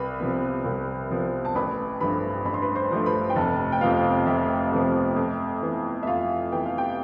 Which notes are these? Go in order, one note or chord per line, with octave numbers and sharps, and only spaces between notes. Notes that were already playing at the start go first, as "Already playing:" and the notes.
Already playing: C2 B4 B5
C3 F3 B3
C2
C3 F3 B3
A5
A1 B4 B5
G2 F3 A3 B4 B5
A1 B5
C6
B4 B5
C5 C6
G2 F3 A3
B4 B5
G5
F1 A4 A5
G5
F2 C3 F3 B3 F4 F5
F1 E5
F2 C3 F3 B3
F2
E3 B3
E5
F2 F4 F5
E3 B3 G5
F5
G4 G5